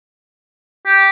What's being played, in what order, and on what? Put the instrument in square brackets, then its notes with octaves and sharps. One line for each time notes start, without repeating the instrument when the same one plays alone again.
[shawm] G4